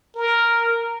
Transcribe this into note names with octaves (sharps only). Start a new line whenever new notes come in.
A#4